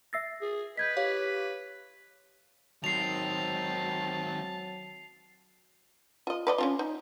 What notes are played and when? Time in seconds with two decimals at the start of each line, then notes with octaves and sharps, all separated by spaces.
0.13 E5 E6 A6 A#6 C7
0.42 G#4
0.77 B4 D#5 G6 G#6 B6
0.97 G4 C#5 F5
2.84 D#3 F#3 C4 A5 C7 F7
6.27 F4 D#5
6.47 B4 D5 D#5
6.58 C#4 D4 F4
6.79 D#4